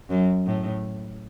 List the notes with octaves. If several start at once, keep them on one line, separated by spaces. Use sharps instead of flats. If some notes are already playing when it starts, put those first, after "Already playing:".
F#2
A2